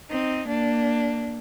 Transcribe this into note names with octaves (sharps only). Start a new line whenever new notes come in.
C4 D#4
A#3 D4